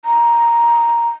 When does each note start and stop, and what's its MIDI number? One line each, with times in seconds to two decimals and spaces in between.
0.05 1.08 82